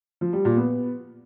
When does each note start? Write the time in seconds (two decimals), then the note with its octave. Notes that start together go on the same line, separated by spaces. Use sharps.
0.21 F3
0.33 G3
0.45 A#2
0.57 B3